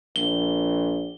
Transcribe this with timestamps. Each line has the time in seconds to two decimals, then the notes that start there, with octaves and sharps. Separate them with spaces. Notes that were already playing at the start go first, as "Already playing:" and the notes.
0.16 A#1 G7